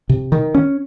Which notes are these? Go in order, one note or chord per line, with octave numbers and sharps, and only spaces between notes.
C3
D#3
C#4